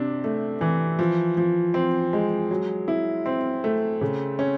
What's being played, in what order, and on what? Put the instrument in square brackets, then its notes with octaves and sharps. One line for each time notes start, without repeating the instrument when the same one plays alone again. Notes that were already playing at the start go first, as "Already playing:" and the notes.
Already playing: [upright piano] C3 D4
A3
E3
F3
F3
C4
G#3
F#3
E4
C4
A3
C#3
C#4